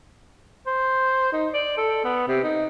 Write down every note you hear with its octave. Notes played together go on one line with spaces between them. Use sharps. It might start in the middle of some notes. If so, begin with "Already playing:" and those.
C5
D#4
D5
A4
B3
C3
D#4